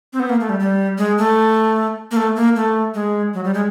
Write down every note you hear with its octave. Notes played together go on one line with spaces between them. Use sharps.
C4
B3
A#3
A3
G3
G3
G#3
A3
A#3
A3
A#3
A3
G#3
F#3
G3
G#3